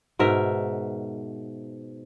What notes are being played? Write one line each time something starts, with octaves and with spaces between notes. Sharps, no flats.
G#2 B2 A#4 E5